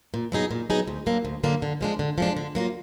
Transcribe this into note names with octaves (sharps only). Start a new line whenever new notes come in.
A#2
F#3 B3 D#4 G#4
A#2
F#3 B3 D#4 G#4
D2
D3 F#3 A#3 D4
D2
D3 F#3 A#3 D4
D3
F3 G#3 D4
D3
F3 G#3 D4
D3
F#3 A#3 F4